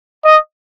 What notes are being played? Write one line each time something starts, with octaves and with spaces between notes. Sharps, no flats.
D#5